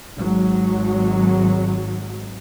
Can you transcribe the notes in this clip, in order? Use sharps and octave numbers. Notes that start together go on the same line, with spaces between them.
G#1 F#3 G#3